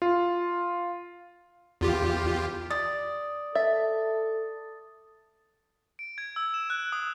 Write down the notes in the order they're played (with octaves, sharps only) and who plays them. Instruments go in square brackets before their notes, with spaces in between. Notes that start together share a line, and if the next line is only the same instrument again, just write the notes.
[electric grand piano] F4
[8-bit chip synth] E2 F4 G4
[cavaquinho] D5 [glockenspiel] D#6
[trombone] A4 [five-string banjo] E5 [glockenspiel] A6
[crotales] D7
G#6
E6
E7
F#6
D#6